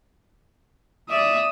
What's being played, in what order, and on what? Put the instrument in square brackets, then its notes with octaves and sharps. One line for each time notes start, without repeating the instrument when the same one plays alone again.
[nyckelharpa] D5 E5 [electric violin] D#6